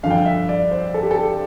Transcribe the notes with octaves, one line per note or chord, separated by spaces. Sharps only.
G2 D3 F3 F5
G5
F5
E5
D5
C5
A4
G4
A4